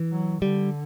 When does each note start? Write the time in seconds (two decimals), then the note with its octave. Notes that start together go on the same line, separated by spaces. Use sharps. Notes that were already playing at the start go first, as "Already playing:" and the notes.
Already playing: E3
0.12 F#3
0.42 D3 G3